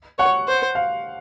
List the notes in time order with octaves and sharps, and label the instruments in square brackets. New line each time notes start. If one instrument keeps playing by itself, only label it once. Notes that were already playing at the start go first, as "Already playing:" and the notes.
[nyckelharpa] C#5 [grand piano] F#5
[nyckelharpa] C5
[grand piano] F5